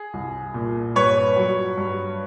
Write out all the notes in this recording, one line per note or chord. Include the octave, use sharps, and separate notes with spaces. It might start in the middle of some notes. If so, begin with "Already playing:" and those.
Already playing: G#4
C2
A#2
G2 B4 C#5
F#3
G2